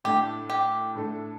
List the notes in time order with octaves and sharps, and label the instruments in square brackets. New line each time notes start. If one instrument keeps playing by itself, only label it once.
[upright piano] A2 A3 D4 A4 [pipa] G4
[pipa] G4
[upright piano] A2 A3 D4 A4